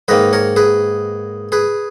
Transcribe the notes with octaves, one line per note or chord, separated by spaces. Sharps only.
G#2 D#3 A#3 B4 D#5
A#4 C#5
G#4 B4
G#4 B4